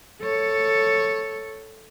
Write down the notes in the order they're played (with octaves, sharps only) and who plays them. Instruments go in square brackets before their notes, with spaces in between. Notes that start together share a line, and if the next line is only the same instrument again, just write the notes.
[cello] A4 C#5